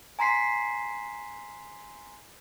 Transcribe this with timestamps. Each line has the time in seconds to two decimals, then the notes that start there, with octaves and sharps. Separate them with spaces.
0.19 G#5 A#5 C6 B6 C7